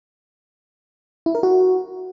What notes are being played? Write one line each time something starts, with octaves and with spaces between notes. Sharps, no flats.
E4
A#4
F#4